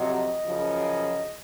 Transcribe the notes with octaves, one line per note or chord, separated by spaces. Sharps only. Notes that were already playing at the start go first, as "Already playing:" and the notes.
Already playing: F2 C3 F#3 D#5
F#2 C#3 F3